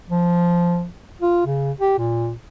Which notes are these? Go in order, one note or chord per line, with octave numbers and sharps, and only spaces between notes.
F3
F4
C#3
G4
A#2